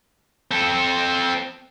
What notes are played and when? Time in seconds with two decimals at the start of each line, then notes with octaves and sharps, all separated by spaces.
0.51 C4 A4